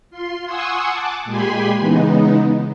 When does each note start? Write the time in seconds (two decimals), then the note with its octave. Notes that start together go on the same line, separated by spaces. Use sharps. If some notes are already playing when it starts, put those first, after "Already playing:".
0.10 F4 C6
0.45 F#5 G#5 C6 C#6 D#6 E6
0.88 F#5 A5 D6
1.25 A#2 G#3 G4 G#5 B5 C6
1.79 C#3 E3 G#3 B3 D#4